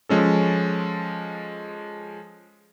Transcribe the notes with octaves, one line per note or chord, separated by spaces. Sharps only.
F3 G#3 C#4 A4